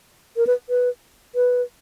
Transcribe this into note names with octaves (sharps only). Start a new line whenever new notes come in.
A#4
B4
B4
B4